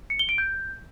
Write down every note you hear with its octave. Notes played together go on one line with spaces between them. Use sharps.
C#7
G7
D7
G6